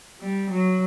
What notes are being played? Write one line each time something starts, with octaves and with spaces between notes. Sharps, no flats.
G3
F#3